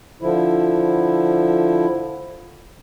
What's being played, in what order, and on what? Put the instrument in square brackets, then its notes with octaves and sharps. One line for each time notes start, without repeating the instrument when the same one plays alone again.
[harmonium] D3 F3 E4